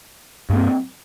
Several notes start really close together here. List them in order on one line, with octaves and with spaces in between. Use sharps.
G2 A#3 C4